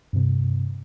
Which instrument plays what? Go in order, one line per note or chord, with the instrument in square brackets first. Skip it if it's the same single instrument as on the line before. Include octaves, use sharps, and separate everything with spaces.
[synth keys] G2 C3